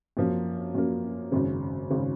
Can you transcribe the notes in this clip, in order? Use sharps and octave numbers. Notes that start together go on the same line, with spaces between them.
F#2 F3 A#3
F#2 F3 A#3
G#1 F#2 C#3
G#1 C#3